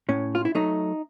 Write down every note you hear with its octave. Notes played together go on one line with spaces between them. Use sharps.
A2 C#4
F4
E4
F#3 A3 D#4